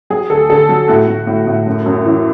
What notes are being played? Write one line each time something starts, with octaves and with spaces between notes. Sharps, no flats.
F#3 G#4
D2 A4
D3 A4
F#3
A2 F#4
A2
A2
A2
F#2
F#2
E3